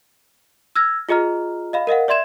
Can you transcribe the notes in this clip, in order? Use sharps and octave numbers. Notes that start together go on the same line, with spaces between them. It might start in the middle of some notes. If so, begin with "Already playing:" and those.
E6 F6 G#6 A#6
F4 G#4 D#5 A#5 F6
D#5 F5 B5
A#4 D#5 F5 F#5
D5 E5 C6 G#6 E7